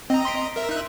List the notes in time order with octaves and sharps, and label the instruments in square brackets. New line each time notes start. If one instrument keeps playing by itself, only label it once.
[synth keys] C4 [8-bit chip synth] D#5 A#5
[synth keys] C6 B6 D7
[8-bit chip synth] A#4 E5
D#4 E5 F#6